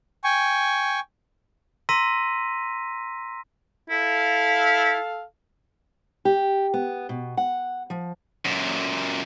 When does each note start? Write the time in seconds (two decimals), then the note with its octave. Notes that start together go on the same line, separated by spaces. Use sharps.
0.24 G5 G#5 C#6
1.89 A#5 C6 E6 A#6 B6 D#7
3.90 E4 A4 F5
6.25 G4
6.74 B3
7.09 B2
7.37 F#5
7.90 F3
8.46 F#2 A#2